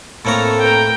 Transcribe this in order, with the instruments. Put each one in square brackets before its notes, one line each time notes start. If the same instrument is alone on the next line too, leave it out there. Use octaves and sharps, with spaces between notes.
[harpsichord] A2 A#3 A#5 [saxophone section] A3 C4 A4 [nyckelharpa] C#5
[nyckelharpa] A#4 G5